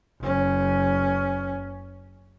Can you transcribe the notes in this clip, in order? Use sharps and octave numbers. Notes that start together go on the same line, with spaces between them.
F#1 C#4